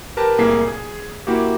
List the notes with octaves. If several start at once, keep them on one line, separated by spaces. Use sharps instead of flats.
G4 A#4 B4 A5
C2 A2 A#3 G#4 B6 C7
G#4
A#3 E4 F#4 G4